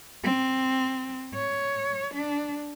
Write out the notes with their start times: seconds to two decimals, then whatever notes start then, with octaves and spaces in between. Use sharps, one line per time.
0.24 C4
1.35 C#5
2.14 D4